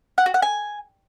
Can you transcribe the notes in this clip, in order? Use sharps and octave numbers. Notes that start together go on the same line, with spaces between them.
F#5
F#4
F#5
G#5